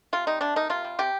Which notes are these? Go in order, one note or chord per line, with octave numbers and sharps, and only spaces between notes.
C3 F4
G3 D#4
C3 D4
A#3 D#4
C3 F4
G3
C3 G4